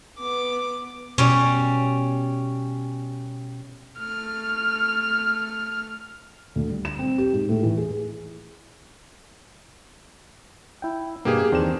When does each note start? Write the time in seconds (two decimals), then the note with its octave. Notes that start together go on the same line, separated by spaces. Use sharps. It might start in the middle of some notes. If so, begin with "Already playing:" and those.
0.20 B3 D6
1.18 B2 G3 C#4
3.99 A3 F6
6.56 D2
6.69 G3
6.85 E7
6.99 C4
7.18 G4
7.33 G#2
7.49 A2
7.63 E3
7.78 G#4
10.82 E4 G5
11.25 G2 B2 A#3 G4 G#4
11.52 E2 D#3 C4 D4 E7